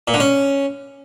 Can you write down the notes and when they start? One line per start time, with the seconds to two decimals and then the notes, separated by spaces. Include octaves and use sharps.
0.08 A#2
0.14 D3
0.20 C#4